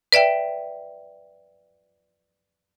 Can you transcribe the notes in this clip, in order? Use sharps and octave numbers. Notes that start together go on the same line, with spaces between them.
B4 D5 E5 G5